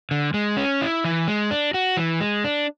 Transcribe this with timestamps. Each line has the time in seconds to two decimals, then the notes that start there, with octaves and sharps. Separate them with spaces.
0.11 D3
0.34 G#3
0.57 C#4
0.81 E4
1.04 E3
1.28 G#3
1.51 D4
1.74 F#4
1.97 E3
2.21 G#3
2.44 D4